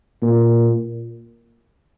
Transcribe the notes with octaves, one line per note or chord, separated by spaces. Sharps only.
A#2